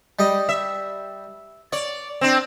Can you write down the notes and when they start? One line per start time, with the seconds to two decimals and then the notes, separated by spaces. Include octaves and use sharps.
0.19 G3 D#5
0.49 E5
1.73 C#5 D5
2.21 C4 D4